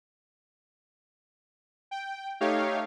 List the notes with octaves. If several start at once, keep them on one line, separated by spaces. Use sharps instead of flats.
G5
A3 D#4 G4 C#5 F5